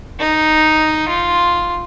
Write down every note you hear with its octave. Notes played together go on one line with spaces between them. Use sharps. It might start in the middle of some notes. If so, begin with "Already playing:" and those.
D#4
F4